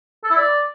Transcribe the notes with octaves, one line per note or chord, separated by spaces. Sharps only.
A4
E4
D5